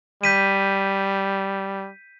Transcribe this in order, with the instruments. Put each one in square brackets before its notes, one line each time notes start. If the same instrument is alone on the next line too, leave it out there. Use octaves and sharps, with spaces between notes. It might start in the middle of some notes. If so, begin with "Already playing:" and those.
[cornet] G3 [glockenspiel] G6 B6 D#7